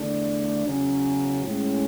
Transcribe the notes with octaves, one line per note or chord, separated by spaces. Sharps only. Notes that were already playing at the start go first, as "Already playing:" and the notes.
Already playing: E2 D3 A3 D4
E2 C#3 F#3 C#4
A2 G#3 C#4